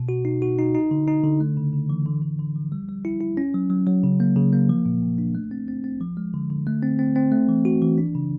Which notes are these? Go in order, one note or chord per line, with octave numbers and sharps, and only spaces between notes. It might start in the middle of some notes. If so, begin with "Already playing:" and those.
Already playing: B2
F#4
D#4
F#4
D#4
D#4
D3
D#4
D3
A3
C#3
C#3
E3
D3
D3
D3
F3
G3
G3
E4
E4
C#4
F#3
F#3
F#3
C#3
A#3
C#3
A#3
F3
A#2
A#2
D4
A3
C4
C4
C4
F3
G#3
D3
D3
A3
C4
C4
C4
A3
E3
F#4
E3
D4
C#3